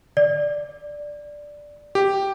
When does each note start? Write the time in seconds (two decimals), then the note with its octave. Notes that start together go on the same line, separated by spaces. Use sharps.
0.17 D5
1.95 G4